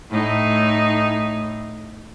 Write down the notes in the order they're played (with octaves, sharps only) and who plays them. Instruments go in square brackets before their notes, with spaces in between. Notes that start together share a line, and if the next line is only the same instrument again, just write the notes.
[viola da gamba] A2 D#4